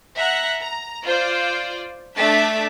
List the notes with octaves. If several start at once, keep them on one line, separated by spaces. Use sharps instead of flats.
E5 F#5 A#5 F#6
A#5
F4 C5 D5
A3 D4 E5 A6 B6